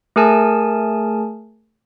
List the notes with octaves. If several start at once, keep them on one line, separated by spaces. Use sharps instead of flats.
A3 G#4 A#4 G#5 A5